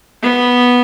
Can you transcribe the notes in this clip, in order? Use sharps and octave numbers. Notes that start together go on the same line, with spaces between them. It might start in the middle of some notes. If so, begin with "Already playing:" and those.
B3